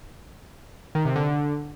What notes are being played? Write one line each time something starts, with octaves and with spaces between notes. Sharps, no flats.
D#3
C3
D3